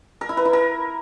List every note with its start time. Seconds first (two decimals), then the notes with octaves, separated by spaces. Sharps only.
0.21 A#4
0.29 E4
0.37 B4
0.45 E4
0.53 A#4